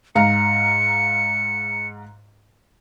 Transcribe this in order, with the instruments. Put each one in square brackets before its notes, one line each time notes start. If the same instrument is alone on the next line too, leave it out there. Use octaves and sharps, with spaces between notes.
[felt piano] G#2 F5 A#5 [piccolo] C#7